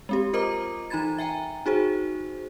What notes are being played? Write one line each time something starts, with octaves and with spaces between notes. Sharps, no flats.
G#3 C4 G4
F4 A#4 C5 D#5 A#5 D6
E3 D#4 A#5 B5 G#6 A6
E5 G5 G#5 A#5
D#4 F#4 G#4 C5